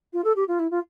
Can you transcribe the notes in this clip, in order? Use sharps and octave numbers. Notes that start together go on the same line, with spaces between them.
F4
A4
G4
F4
E4
F4